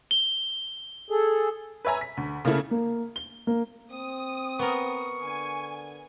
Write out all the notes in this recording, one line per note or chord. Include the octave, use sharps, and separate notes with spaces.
G7
G#4 A4
B4 C#5 E5 G#5 A#5
B6
D2
C#3 A3 A#3 E4 A4
A#3
G7
A#3
C4 D#6
B3 A#4 C#6
D3 G#5